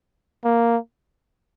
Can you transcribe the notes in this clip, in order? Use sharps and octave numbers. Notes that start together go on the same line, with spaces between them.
A#3